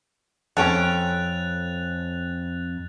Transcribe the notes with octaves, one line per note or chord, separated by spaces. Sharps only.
F2 C#4 A4 G5 F#6 A6 F7